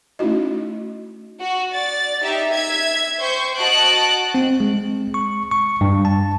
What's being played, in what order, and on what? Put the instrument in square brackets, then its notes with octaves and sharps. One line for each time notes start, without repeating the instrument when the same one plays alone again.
[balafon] A3 C#4 D#4 E4 F#4 D#5
[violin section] F#4
D5 A6
D#4 G4 E5
E5 G#6
C5 G5 C#6 G6
F#4 D#5 A5 F#6 D7
[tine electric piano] C4
G#3
C#6
C#6
G2
A5